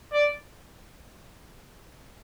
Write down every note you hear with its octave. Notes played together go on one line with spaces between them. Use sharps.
D5